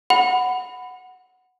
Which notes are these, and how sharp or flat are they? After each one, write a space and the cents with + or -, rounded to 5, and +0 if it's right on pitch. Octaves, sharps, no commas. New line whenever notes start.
F#5 +0 B5 +15